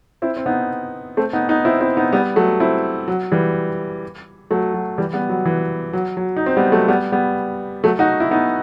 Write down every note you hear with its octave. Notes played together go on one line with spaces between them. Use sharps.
C4 E4
C4
B3 D#4
A3 C4
B3 D#4
B3 D#4
C4 E4
C4 E4
B3 D#4
G3 B3
F#3 A3
C4 E4
F#3
E3 G3
F#3 A3
F#3
E3 G3
G3 B3
F#3
E3
F#3
F#3
D#4
C4
G3 B3
F#3 A3
G3 B3
G3 B3
F#3 A3
D#4 F#4
E4
B3 D#4